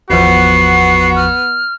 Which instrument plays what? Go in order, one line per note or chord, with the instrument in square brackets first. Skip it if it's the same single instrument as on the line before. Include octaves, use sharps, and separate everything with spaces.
[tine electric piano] G#1 E2 F3 [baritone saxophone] B3 [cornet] F#4 [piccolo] C7
[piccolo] F6